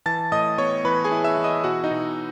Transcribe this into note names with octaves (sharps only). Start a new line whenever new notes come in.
E3 A5 A6
A2 D#5 D#6
B3 C#5 C#6
E3 B4 B5
G#4 G#5
E4
E5 E6
E3
D#5 D#6
B2 F#4 F#5
D#4 D#5
B2